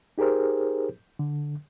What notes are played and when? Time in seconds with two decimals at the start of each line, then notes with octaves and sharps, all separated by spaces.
0.18 D#4 G4 G#4 A#4 C5
1.19 D3